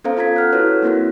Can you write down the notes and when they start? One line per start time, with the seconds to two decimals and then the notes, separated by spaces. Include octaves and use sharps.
0.04 B3 C#4 A4 C5 F5 A#5
0.17 F4 A4 A#5 G#6 B6
0.36 F#5 F6 F#6
0.53 E4 F#4 A4 B4 C#5
0.82 A#3 C4 E4 F#4 A#4